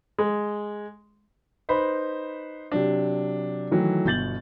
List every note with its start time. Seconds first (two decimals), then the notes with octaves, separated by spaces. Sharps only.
0.18 G#3
1.69 D#4 B4 C5 B5
2.72 C3 F#3 D4
3.71 D#3 E3 F#3 A3
4.05 G1 B2 G6 A6 F#7